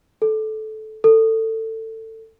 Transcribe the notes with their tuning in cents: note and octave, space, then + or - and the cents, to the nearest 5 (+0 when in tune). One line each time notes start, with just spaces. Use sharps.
A4 -15
A4 +20